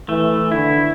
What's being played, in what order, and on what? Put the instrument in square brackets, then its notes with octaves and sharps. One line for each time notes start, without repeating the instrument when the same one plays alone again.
[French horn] E3 [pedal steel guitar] A3
[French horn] D3 [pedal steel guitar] E4